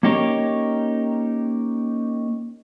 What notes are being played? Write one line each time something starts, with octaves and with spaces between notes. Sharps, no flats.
A#3 C#4 D#4 G4 A#4 C#5